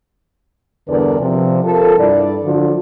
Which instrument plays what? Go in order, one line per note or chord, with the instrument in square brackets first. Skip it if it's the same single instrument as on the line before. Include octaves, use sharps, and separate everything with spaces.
[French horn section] E2 G2 D3 A#4 B4 D5
C3 F3
F3 A4 A#4
G2 E4 D5
D3 F3 F#3